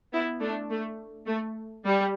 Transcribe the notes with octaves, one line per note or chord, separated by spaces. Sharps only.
B3 E4
A3 D4
A3
A3
G3